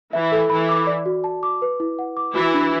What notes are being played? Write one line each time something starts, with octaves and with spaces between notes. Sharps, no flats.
E3 E4 E5
A4
E3 E4 B5
D6
D5
F#4
A5
D6
B4
E4
F#5
D6
E3 E4 F#4
D4